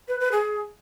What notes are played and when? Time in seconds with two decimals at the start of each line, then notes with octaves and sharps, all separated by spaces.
0.08 B4
0.20 B4
0.32 G#4